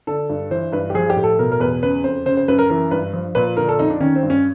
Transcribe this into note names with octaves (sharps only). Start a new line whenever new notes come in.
D3 A4
G2
E3 C5
G2 B4
G4
F3 G#4
G4
A2
A4
B2 A#4
A#4
E2 B4
C#3 B4
F2 C5
C#3 C5
C5
F#2 B4
A#4
E3 A#4
G2 B4
F3
A#2 B4
D3 A#4
A4
F2 D#4
D4
D#3 C#4
C4
G2
C#4